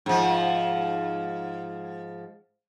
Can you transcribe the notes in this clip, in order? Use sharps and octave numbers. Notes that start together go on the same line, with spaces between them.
G#2 F3